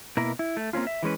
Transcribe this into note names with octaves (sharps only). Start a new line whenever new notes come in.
B2 A#3 E4 A#4
E4
A3
A#3 C4 C#4 F4
E5
E3 G#3 C#4 B4